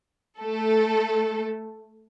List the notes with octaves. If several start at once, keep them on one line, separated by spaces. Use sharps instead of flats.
A3 A4